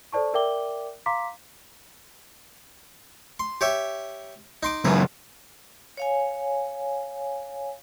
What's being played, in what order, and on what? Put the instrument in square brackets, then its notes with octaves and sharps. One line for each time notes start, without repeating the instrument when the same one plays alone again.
[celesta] A4 C5 D5 A5 C#6
A#4 D5 E5 G5 D6 G7
F5 A#5 C6 D6 B6
[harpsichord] C6
G4 C#5 E5
D#4 C6 D6
[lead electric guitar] C#2 F#2 [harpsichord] B4
[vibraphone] C#5 F5 G#5